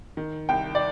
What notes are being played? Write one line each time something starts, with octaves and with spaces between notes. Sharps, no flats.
D#3
C2 G5
D5